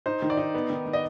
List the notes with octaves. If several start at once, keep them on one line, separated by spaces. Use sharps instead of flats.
D#4 C5
D#3
D5
D#4
B3
D#3
D#3
D#5